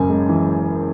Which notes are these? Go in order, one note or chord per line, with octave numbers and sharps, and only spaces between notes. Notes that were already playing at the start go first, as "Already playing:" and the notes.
Already playing: F#1 F#2 G#5
G#3
E3